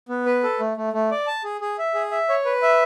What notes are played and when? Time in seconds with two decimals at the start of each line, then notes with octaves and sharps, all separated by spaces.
0.09 B3
0.26 B4
0.43 A4
0.60 A3
0.77 A3
0.93 A3
1.11 D5
1.27 A5
1.44 G#4
1.61 G#4
1.79 E5
1.94 G#4
2.11 E5
2.29 C#5
2.45 B4
2.62 E5